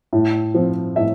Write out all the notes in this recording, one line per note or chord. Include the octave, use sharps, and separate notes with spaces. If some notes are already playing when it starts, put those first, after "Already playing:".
A2
F3 C4
A2 E5